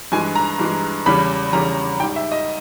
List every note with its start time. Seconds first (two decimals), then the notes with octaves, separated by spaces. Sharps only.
0.12 G2 E3 G#3 G#5
0.36 A#5
0.59 G2 E3 G#3
1.06 E2 C#3 G3 B5
1.53 E2 C#3 G3 A#5
1.99 G#2 G3 G5
2.16 E5
2.32 D#5